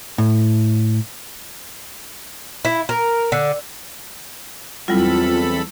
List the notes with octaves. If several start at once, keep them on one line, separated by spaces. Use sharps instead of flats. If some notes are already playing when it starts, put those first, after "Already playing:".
A2
E4
A#4
D3
E2 F#3 G3 C4 E4 F4 A4 B5